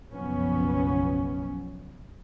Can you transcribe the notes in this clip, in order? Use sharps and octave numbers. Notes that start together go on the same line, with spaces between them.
F#1 B1 F3 F#3 B3 C#4